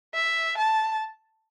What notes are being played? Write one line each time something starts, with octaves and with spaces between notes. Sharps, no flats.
E5
A5